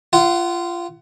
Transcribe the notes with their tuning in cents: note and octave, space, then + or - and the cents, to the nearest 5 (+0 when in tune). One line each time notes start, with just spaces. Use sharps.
F4 -20 F#5 +25